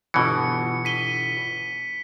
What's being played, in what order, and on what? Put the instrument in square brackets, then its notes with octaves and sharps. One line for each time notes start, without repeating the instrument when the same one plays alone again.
[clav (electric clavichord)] G1 B2 E3 [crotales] C#7
[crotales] B6 D#7 G7